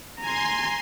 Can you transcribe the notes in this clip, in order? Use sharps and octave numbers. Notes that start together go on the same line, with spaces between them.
G#5 A#5 C6